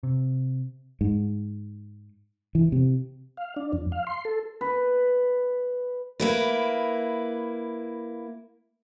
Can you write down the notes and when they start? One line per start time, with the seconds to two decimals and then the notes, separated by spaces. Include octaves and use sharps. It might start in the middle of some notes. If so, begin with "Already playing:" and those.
0.03 C3
1.01 G#2
2.55 E3
2.72 C3
3.37 F5
3.56 D4
3.73 F2
3.92 F5
4.07 C6
4.25 A4
4.61 B4
6.20 A#3 E4 B4